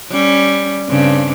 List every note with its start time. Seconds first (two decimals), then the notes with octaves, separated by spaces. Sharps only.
0.11 G3 C#4
0.88 G2 C#3 C4